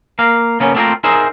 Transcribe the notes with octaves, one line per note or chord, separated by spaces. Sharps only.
A#3 F5
C#3 A#3 B3 C#4
A3 A#3 C4 D#4 F4 A#4
D#4 G#4 A#4 C5 E5